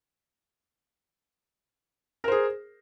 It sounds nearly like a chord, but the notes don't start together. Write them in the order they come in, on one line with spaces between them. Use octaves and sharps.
A#4 C5 G#4